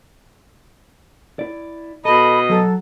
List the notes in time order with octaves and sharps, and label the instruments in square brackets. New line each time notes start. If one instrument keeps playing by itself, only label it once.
[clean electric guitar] E4 D5
[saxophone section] B2 D#5 [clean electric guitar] A4 [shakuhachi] B5
[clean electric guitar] F#3 [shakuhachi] A4